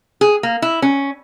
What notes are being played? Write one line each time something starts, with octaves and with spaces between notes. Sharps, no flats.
G#4
A#3
E4
C#4